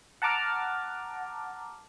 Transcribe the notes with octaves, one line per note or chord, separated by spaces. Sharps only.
F#5 A5 A#5 D6 F6